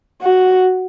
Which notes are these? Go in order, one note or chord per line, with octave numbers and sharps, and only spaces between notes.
F#4